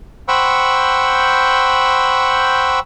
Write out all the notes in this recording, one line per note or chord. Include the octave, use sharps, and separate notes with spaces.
C5 F#5 G5 B5 C#6 E6